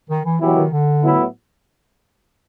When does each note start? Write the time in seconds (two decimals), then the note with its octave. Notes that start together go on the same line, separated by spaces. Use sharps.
0.09 D#3
0.25 E3
0.40 B2 E3 F#3 B3 E4 G4
0.57 D#3
0.71 D3
1.02 A2 F#3 B3 E4